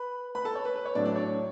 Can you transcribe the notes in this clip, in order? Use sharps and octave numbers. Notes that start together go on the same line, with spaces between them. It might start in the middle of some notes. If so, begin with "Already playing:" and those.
Already playing: B4 B5
B4 B5
A4 A5
C#5
B4
B4
C#5
A2 F#3 A3 D4 D5
D4 D5
C#5